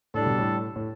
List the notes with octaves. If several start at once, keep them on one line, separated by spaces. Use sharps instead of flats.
A2 G3 D4 A4
B2
A2
A2